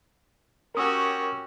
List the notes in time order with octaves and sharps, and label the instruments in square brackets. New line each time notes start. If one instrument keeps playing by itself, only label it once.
[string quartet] C#4 F#4 G4 [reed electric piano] A#4 D#6 E6